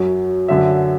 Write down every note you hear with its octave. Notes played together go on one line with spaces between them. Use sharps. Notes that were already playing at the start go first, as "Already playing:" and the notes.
Already playing: F#2 F#3
F#2 D3 F#3 E5